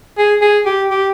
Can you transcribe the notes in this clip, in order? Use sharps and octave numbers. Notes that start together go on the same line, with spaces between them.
G#4
G#4
G4
G4